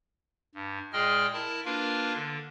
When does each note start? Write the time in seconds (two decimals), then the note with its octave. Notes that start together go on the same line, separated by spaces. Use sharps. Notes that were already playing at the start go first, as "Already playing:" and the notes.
0.55 G2
0.93 A#2 G#3 G#4 D#5 G5 F6
1.33 E4 A#4 A5
1.65 A#3 D4 F4 A#4 B4
2.15 D3